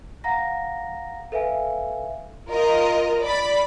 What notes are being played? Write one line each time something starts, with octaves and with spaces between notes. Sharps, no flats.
F5 F#5 A#5 A#6
A4 B4 E5 F5 G#5
F4 A#4 D#5
D5 B5